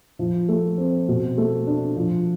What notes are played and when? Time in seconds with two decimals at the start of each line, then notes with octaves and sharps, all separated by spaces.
0.19 F3
0.49 A3
0.78 C4
1.08 B2
1.38 A3
1.67 D4
1.97 F3